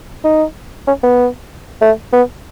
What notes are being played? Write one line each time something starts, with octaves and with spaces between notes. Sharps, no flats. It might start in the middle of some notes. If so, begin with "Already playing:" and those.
D#4
C#4
B3
A3
B3